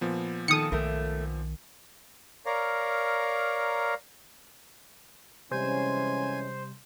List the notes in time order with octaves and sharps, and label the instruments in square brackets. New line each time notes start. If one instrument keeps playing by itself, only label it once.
[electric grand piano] A#2 F3 B3
[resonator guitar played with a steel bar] D#3 A4 [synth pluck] D#6 C#7
[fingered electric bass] B1 D#3 [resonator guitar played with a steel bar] A3 A#4
[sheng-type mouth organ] A#4 C#5 D5 F5 A#5
[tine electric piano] C3 G3 [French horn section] E3 G#3 C#4 [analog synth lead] C5 [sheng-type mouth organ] G#5